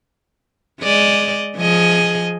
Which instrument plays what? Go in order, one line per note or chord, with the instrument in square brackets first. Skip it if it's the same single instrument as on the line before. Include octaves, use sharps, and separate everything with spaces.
[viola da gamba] G#3 D5 D#5
F3 G#4 D#5